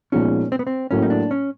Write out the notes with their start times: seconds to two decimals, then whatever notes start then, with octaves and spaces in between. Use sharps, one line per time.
0.12 A#2 F3 G#3 B3 C#4 D#4
0.52 C4
0.59 B3
0.67 C4
0.91 A2 F#3 A#3 C#4
1.02 D#4
1.10 D4
1.31 C#4